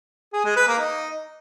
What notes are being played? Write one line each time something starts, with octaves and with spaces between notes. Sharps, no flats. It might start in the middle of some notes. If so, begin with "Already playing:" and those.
G#4
G#3
B4
A#3
D#4